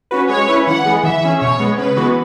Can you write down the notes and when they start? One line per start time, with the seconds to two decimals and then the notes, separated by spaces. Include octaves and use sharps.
0.11 C#4 F#4 B4
0.29 G#3 C#5
0.48 C#4 E4 B4
0.67 E3 F#5
0.86 G#3 B3 G#4
1.04 E3 E5
1.22 C#4 G#4
1.41 B2 C#5
1.60 G#3 B3
1.78 C#3 B4
1.96 E3 G#3 B3 F#4